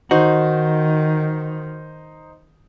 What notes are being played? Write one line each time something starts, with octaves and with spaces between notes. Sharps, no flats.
D#3 D#4 F#4 C5